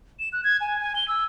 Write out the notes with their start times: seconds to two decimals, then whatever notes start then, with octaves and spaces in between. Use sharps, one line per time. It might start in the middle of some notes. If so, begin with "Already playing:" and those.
0.19 E7
0.33 F#6
0.44 G#6
0.61 G#5
0.79 G#5
0.96 G7
1.08 E6